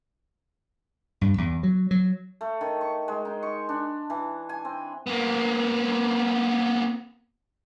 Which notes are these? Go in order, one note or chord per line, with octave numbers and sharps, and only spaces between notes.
G2
E2
F#3
F#3
A3
D#3
C#6
G#3
D#4
C#6
D4
E3
G#5
C4
A#3 B3